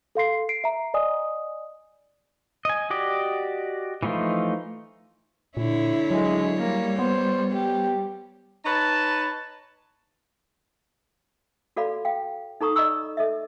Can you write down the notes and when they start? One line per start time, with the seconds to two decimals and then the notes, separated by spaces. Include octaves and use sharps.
0.15 A4 F5 C6 C7
0.49 C7 D7
0.64 E5 A#5
0.94 D5 D#5 G#5 D#6
2.65 D#5 G#5
2.90 F#4 G4 D5 D#5
4.03 E3 F3 A3 D#4 F4
5.57 A#2 D3 E4 C#5
6.11 F#3 G#3
6.58 G3 A#3
6.99 B3 C5
7.52 G3 G4
8.65 D#4 B4 C#5 A5
11.77 F#4 A4 D5 F5 B5
12.05 F5 G5
12.61 D#4 A4 A#5 C#6 D#6
12.76 D5 D#5 A#5 B5 C#6 E6
13.17 A4 D#5 E5